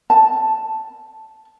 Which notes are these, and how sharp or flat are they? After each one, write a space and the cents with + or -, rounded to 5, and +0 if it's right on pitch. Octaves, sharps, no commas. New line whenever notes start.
A5 +0